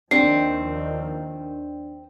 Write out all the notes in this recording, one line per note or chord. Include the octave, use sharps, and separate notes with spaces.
D#2 D#3 F3 C4 D4 C7